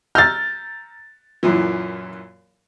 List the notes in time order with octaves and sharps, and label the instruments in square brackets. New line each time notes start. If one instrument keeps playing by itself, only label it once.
[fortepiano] A#5 E6 F6 [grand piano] G6 A6
[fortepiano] F#2 A#2 E3